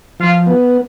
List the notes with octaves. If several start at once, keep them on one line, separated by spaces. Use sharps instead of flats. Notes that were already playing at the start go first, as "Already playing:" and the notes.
F3 F4
B3